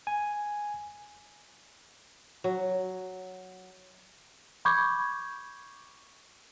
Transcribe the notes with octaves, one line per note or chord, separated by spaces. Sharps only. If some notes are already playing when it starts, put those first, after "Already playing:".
G#5
F#3
B5 C#6 D6 G6 G#6